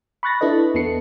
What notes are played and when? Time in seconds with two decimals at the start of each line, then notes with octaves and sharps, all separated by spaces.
0.23 B5 C#6 F#6 A6 A#6
0.41 D4 E4 A4 B4 D#5
0.74 E2 B3 A4 C7 C#7